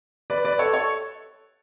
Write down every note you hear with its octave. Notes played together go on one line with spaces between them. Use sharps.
B4 D5
B4 D5
A4 C#5
A4 C#5